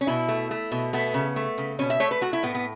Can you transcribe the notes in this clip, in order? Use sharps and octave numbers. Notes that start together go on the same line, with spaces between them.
C#4
B2 E4
A3
A3
B2
A3 B3
C#3
A3
C#3
B2 C#4
E5
A3 C#5
B4
A3 F#4
E4
A2 B3
B3